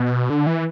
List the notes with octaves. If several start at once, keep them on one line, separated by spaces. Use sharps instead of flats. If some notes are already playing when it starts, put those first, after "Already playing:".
Already playing: B2
D3
E3